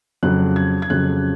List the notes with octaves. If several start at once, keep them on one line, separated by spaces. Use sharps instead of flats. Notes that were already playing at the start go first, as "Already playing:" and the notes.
F2 C#3 F#3 F#6
G#6
G#6
F2 C#3 F#3 F#6